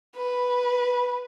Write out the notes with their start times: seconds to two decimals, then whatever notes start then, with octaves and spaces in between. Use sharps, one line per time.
0.16 B4